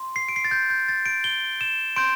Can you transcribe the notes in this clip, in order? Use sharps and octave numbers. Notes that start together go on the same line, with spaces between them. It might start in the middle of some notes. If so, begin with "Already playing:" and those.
Already playing: C6
C7
D7
C7
A6
G6
G6
A6
D7
G7
E7
C6 G6 D7